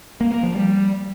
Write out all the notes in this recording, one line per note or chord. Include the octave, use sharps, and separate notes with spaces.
A#3
A#3
F3
G3